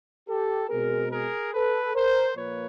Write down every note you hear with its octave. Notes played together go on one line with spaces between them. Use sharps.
G4 A4
B2 G#3 C4 G#4 A#4
G#4 A#4
A4 B4
A#4 C5
A#2 F3 A#3 B4 C#5